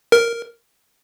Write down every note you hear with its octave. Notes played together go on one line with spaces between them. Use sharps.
A#4